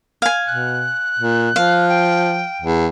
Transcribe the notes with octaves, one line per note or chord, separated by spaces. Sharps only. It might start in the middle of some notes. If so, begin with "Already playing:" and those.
F5 G#5
B2 F#6
A#2
F3 F5
G5
E2